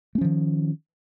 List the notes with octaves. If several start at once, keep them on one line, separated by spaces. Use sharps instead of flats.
D#3 F3 A3 C#4